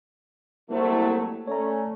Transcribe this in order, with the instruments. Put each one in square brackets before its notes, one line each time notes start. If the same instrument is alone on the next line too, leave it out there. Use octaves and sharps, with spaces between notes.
[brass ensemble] C2 F#3 A3 [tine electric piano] A#3 E4 C5
[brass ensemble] A3 C#4 [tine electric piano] C#5 D5 A#5